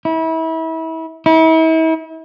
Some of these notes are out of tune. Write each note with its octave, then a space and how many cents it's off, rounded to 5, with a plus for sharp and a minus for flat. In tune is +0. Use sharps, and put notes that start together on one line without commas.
E4 -30
E4 -40